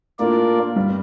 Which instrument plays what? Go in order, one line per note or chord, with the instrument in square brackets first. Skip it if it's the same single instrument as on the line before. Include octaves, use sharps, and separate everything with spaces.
[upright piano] A2 A3 [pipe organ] A#3 D4 F4 A#4 D5
[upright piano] G2 G3